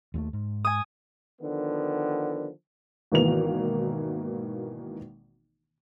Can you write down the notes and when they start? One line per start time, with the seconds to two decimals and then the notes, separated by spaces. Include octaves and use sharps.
0.14 D#2 G3 A3
0.33 G#2
0.65 G#5 D#6
1.41 D3 D#3 F3 B3
3.12 G#1 B2 D#3 E3 A#3 F7